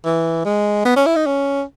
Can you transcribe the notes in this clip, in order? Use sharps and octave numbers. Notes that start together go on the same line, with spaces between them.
E3
G#3
B3
C#4
E4
D#4
C#4